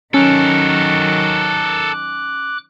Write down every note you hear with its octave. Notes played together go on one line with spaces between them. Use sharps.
D#3 F#3 C#4 A4 A#4 D6 F#6